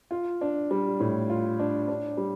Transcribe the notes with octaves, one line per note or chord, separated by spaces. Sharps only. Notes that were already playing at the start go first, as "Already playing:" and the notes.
F4
D4
G3
A2
F4
D4
D4
G3